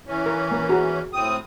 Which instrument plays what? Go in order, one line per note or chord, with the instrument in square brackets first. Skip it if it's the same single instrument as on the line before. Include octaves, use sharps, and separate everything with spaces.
[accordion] E3 C#4
[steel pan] A#4
A#3 A#4
F#4 G#4 A#5
[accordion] A2 C4 D#6